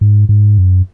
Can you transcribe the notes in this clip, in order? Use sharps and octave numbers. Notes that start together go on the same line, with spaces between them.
G#2
G#2
F#2